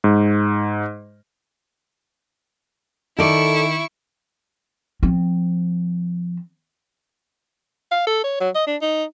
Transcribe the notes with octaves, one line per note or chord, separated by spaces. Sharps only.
G#2
D#3 E4 A4 D5 C#6
F3 C4
F5
A4
C#5
F#3
D#5
D4
D#4